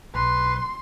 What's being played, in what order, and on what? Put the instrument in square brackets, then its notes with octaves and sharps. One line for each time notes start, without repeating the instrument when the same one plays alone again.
[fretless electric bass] B1 [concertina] B4 [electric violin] C6